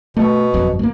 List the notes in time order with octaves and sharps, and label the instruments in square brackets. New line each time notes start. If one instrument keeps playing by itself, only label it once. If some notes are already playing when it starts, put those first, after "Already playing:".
[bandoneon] B2 [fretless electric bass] A3
[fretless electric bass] G1 F2 F#3
A3 A#3